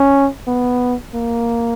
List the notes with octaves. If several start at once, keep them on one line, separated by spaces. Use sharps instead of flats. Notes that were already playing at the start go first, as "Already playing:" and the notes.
Already playing: C#4
B3
A#3